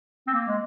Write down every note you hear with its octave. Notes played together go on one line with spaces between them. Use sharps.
C4
A#3
G#3